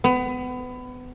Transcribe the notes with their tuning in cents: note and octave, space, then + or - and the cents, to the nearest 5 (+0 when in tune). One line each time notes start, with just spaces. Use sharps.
B3 +25